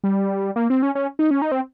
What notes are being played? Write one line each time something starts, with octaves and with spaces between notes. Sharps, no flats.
G3
A#3
C4
C#4
C#4
D#4
C#4
D#4
C4